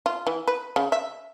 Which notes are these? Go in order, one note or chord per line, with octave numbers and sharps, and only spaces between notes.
F4
E3
B4
C#3
E5